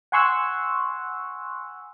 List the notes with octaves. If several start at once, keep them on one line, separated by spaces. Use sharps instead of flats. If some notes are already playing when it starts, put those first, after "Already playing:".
F#5 G#5 C6 C#6 E6 F#6